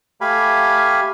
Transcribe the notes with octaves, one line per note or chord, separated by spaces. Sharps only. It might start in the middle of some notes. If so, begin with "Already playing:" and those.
A3 G4 F5 G#5 B5